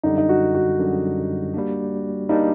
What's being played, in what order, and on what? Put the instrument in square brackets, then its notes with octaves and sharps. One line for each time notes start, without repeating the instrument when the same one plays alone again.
[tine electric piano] F#2 D3 G3 [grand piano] D#4
[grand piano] D#4
F#4
F#4
[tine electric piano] F#2 D3 G3
G3 A#3 D4
[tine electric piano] G3 A#3 D4 [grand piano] D#4